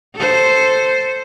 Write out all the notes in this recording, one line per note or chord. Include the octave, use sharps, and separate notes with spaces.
A4 C5